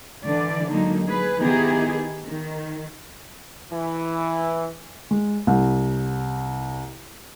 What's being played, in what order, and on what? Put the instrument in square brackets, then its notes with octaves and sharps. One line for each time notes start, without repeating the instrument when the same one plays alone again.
[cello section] D3 E3 D5
D3 F#3 G#3 A#3 D#4
G#4 B4
D#3 B3 D#4 E4 G4 G#4
D#3
[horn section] E3
[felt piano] G#3
C2